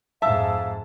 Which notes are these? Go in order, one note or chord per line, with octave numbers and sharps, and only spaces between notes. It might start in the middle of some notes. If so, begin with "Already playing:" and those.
F2 G#2 E5 F5 A5 E6